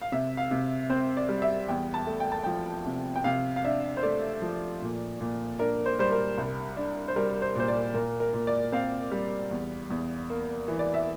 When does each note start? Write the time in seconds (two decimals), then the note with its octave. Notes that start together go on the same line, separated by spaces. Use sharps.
0.02 F5
0.12 C3 E5
0.37 F5
0.51 C3
0.90 C4 C5
1.17 D5
1.29 G3
1.42 E5
1.68 E2 G5
1.94 A5
2.07 A3
2.20 G5
2.32 A5
2.44 F3 G5
2.86 C3
3.16 G5
3.24 C3 F5
3.56 F5
3.64 D4 E5
3.97 C5
4.03 A3 D5
4.42 F3
4.82 A#2
5.20 A#2
5.59 D4 A#4
5.86 C5
5.99 G3 C5
6.12 A#4
6.38 C2
6.77 D4
7.08 C5
7.16 G3 A#4
7.42 C5
7.56 A#2 C5
7.68 D5
7.94 A#2 A#4
8.20 A#4
8.33 A#2
8.47 D5
8.72 C4 F5
9.11 G3
9.51 E2
9.90 E2
10.30 A#3
10.68 E3
10.79 D5
10.94 E5